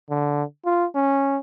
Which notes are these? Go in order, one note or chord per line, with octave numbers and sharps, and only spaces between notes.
D3
F4
C#4